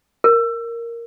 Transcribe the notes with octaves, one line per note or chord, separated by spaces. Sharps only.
A#4